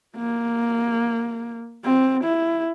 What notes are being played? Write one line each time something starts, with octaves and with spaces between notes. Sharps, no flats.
A#3
C4
E4